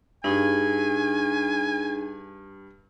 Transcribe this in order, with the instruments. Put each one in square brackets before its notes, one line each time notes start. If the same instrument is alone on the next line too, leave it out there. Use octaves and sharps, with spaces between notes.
[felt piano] G2 [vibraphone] D4 D#4 G#4 [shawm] G#5